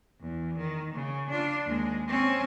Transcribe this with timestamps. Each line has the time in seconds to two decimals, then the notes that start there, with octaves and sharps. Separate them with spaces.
0.21 E2
0.58 D#3
0.94 C#3
1.30 D4 F4
1.65 D#2 G#3
2.08 C4 C#4